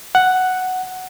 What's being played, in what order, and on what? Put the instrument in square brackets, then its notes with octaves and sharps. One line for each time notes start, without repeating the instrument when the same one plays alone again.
[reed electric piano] F#5